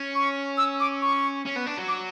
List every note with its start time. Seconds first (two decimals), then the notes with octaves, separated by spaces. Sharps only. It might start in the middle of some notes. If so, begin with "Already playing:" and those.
Already playing: C#4
0.15 C#6
0.57 E6
0.80 D6
1.02 C#6
1.45 C#4
1.56 B3
1.66 D4
1.77 F#3
1.88 D6